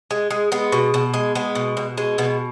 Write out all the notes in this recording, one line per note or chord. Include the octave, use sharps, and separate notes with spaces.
G#3
G#3
G#3 B3
B2
B2
G#3
G#3 B3
B2
B2
G#3
B2 B3